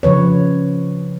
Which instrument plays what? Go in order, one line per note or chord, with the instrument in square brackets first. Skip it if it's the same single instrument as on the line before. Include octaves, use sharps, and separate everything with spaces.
[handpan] C#3 F3 B4 C#5